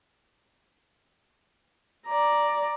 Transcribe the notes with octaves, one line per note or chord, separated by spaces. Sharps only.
D5 A#5